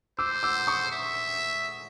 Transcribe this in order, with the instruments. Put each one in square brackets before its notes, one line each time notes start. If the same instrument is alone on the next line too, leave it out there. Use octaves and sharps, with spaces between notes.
[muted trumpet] C5 [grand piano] D6 E6
[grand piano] D6 E6
C#6 D#6
[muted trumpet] E5